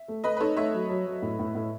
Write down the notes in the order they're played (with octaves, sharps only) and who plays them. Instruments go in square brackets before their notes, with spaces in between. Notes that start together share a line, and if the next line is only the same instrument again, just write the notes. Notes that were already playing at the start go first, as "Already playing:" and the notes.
Already playing: [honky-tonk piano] E5
[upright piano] A3
[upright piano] A3 [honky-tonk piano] B4 D#5
[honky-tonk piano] B4
[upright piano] D#4 [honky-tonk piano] A4 C#5
[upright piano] A3 [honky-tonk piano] C#5 E5
[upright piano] F#3
F#3
F#3
A2
A2
A2